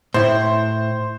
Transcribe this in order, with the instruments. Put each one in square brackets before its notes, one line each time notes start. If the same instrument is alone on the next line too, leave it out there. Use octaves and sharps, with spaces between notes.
[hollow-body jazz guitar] A2 E4 [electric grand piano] C5